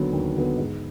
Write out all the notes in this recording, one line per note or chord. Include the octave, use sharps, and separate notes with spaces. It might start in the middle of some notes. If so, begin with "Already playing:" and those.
Already playing: D#2 D3 F#3 B3 B4
D#2
D3 F#3 B3
G#2